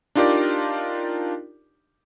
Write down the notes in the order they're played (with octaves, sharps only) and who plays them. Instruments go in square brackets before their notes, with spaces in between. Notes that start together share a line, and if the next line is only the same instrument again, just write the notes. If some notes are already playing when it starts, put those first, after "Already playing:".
[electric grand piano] D4 D#4 F4 G4 A#4 D5